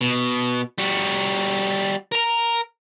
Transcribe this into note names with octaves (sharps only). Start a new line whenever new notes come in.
B2
G3 F#4
A#4 A#5